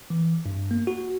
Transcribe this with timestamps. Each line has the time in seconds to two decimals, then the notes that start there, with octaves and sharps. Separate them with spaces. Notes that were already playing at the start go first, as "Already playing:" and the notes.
0.10 E3
0.46 G2
0.71 A#3
0.87 F#4